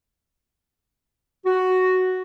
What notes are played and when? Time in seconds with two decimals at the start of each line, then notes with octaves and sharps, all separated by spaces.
1.46 F#4